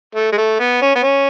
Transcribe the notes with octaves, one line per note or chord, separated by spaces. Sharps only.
A3
G#3
A3
B3
C#4
B3
C#4